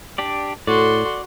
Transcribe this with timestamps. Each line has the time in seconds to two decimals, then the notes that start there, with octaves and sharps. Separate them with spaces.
0.18 D4 G4 D5
0.67 A2 F#4 A4 D5 C6